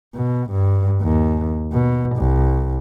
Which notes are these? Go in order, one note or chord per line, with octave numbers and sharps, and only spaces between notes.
B2
G2
D#2
B2
C2